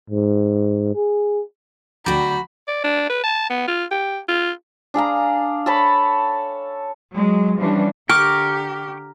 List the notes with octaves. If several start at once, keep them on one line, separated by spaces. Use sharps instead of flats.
G#2
G#4
D2 F#3 F#4 D5 G5 B5
D5
D4
B4
A5
B3
F4
G4
F4
D4 G#4 F5 A#5
A4 C#5 A5 B5
F#3 G#3
E3 F3 G3 C#4 D4
D3 G4 A#4 G5 C#6 D6 F6